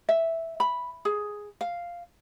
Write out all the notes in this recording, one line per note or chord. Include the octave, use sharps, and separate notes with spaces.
E5
B5
G#4
F5